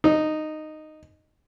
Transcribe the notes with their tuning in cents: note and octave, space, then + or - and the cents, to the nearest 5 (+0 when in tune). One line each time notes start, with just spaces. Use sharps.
D#4 -10